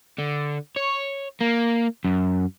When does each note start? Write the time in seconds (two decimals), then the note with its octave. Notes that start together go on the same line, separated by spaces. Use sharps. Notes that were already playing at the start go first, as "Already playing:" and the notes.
0.18 D3
0.76 C#5
1.41 A#3
2.05 F#2